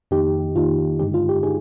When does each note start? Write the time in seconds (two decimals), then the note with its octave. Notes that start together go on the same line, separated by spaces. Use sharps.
0.11 F2 D#3 A#3 D#4 G4
0.56 F2 D#3 A#3 D#4 F4
1.00 G2 D3 G#3 D#4 G4
1.14 F4
1.29 G4
1.43 D3 G#3 D#4 G#4